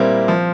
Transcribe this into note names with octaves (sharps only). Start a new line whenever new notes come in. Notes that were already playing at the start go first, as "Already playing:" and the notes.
Already playing: A#2 G3 A#3 C4 E4
F3